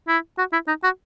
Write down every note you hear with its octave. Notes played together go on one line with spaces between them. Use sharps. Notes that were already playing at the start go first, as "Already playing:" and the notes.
E4
F#4
E4
D#4
F#4